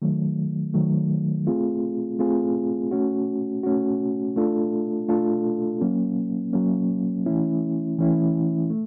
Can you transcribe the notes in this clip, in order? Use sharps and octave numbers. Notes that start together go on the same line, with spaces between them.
D#3 F#3 A3
D#3 F#3 A3
A3 C4 F4 G#4
A3 C4 F4 G#4
A3 C#4 F#4
A3 C#4 F#4
A3 D4 F4 A4
A3 D4 F4 A4
F#3 A#3 C#4
F#3 A#3 C#4
E3 A3 C#4 E4
E3 A3 C#4 E4
A3